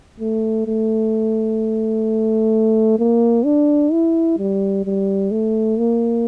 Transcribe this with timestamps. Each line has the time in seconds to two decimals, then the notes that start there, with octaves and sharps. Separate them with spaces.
0.20 A3
0.67 A3
2.99 A#3
3.45 D4
3.92 E4
4.38 G3
4.85 G3
5.31 A3
5.78 A#3